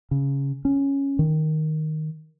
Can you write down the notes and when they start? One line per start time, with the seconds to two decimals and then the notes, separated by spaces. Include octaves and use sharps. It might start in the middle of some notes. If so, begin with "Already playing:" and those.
0.11 C#3
0.65 C#4
1.19 D#3